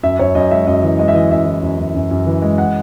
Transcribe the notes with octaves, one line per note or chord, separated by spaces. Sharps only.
F#2 E5
F#2 C#5
F#2 D#5
G#3 E5
F#2 D#5
E3 D#5
G#3 D#5
E5
E3 D#5
F#2 E5
E3
F#2
F#2
F#2
F#2
E3
G#3
F#5